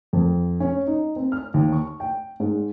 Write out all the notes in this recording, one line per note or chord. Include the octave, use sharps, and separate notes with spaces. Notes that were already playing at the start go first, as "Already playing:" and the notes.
F2
C#4
D#4
C4
F6
D#2
C#6
G5
G#2